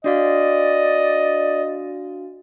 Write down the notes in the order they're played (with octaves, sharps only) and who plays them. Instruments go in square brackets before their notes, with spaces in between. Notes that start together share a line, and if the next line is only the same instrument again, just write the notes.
[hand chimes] D4 F#4 F5 [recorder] D5 [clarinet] D#5